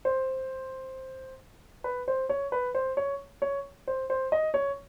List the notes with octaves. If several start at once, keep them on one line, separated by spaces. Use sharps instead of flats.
C5
B4
C5
C#5
B4
C5
C#5
C#5
C5
C5
D#5
C#5